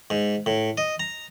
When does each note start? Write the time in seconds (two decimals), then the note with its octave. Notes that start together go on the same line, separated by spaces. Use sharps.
0.10 G#2
0.46 A2
0.78 D#5
1.00 A#5